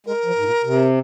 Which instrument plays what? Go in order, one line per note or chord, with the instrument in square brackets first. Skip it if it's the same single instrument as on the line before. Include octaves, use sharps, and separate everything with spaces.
[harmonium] G#3 [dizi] A#4
[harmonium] F3
G#2
A#2
C3